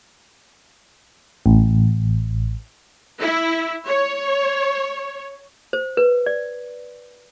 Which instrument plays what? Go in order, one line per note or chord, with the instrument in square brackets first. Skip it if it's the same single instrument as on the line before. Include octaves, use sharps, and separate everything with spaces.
[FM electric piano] A1
[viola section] E4
C#5
[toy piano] C5
B4
D5